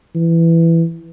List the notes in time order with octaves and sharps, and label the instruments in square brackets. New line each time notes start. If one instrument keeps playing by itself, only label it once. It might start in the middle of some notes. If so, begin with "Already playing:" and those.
[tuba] E3